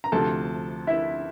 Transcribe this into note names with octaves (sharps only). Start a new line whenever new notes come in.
A#5
D2 C3 F3 A3 A4 A5
E4 E5